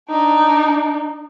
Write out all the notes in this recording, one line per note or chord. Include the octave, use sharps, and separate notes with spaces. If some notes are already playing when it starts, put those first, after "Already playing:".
D4 D#4